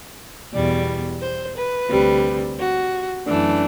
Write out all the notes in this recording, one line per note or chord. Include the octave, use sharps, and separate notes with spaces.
E2 B2 G3 D5
C5
B4
D2 C3 G3
F#4
F#2 E3 A3 D4